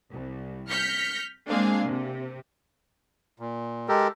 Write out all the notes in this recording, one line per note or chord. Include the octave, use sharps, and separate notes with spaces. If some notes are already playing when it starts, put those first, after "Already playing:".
C2
F6 G6 A#6 B6 C#7
G#3 A#3 C4 D4 G#4 F5
C3
A#2
G#3 G4 A4 A#4